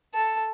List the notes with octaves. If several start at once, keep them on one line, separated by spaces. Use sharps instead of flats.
A4